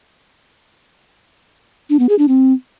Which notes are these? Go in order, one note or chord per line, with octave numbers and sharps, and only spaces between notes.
D4
B3
G#4
D4
C4